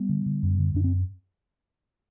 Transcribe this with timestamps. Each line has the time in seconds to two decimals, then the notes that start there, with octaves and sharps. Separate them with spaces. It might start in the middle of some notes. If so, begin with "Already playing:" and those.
Already playing: G3 B3
0.09 D3
0.26 D3
0.43 F#2
0.59 D3
0.74 F#2 D4
0.84 C4